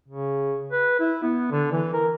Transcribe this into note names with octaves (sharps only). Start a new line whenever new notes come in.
C#3
B4
E4
B3
D3
E3
A#4